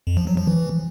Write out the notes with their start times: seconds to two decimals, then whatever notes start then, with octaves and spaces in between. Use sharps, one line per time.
0.07 F2
0.17 F3
0.27 F#3
0.37 F3
0.47 E3